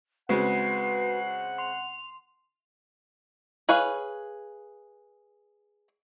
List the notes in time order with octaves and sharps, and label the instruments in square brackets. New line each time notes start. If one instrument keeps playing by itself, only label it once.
[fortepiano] C#3 G#3 C4 [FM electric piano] F#4 B4 [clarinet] F#5 [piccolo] C7
[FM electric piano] C6 [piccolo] F7
[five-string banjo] G#4 B4 C#5 F5